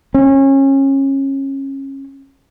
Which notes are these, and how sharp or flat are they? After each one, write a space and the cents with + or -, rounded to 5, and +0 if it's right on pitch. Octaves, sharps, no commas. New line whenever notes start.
C#4 -25